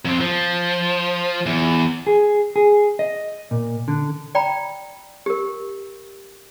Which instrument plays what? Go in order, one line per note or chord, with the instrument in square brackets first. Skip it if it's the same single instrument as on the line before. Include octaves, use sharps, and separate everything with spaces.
[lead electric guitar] F2 C4
F3
E2
[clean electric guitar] G#4
G#4
D#5
A#2
D3
[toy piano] D5 G5 A#5 B5
G4 A#4